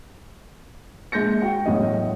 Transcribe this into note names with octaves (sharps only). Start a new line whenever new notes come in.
A#1 G#3 G6 A#6 C#7
F#4 G5
E2 A2 F#3 F#4 D#5